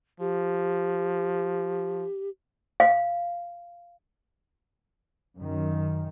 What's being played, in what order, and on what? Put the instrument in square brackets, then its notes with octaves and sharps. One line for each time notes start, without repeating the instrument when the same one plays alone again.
[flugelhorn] F3 [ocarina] G4
[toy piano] F5
[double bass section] F#2 D#3